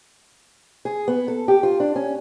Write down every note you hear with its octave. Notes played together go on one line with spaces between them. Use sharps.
G#4
B3
A4
G4
F4
D4
C#4